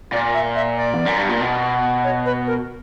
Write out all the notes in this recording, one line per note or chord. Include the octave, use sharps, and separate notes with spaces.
A#2 D5
E5
E5
D5
E2
F#2
G2
A#2
B2
C#5
B4
A#4